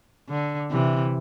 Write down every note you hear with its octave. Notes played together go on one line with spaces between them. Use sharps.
D3
C3 E3